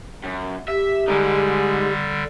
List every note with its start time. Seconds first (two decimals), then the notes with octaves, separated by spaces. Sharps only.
0.24 F#2
0.68 G4 E5
1.07 D3 G3 G#3 D#4